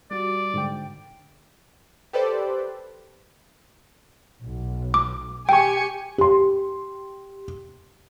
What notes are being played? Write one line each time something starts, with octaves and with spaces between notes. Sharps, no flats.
G3 F#4 D5
G#2 D3 G5
G4 A4 B4 C5 D5
B1
D6
G4 G5 G#5 C#6 C#7
G4 C6